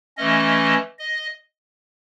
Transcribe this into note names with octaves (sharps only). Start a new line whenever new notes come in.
E3 A3 C#4 D#5
D#5